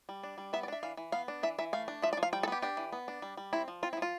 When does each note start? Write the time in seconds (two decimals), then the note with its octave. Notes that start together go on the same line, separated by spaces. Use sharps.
0.09 G3
0.23 D4
0.38 G3
0.53 B3 E5
0.63 D5
0.68 D4 E5
0.83 E3 F5
0.97 E3
1.12 B3 F5
1.28 D4
1.43 E3 E5
1.58 E3 E5
1.73 A3 F5
1.88 D4
2.02 F3 E5
2.13 D5
2.17 F3
2.23 F5
2.33 G3 G5
2.43 A4
2.48 B3 G4
2.62 D4 G4
2.77 E3
2.93 B3
3.08 D4
3.22 G3
3.37 G3
3.53 C4 E4
3.68 F3
3.83 C4 F4
3.93 E4
3.97 F3
4.02 F4